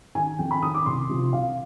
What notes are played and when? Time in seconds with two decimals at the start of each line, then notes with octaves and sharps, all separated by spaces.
0.15 D#3 G#5
0.39 F2 G5
0.51 B5
0.62 D#3 D#6
0.75 D6
0.86 C2 C6
1.09 C3 F3
1.33 C2 F5